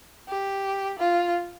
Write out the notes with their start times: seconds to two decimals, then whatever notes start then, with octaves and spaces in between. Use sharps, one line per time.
0.28 G4
0.99 F4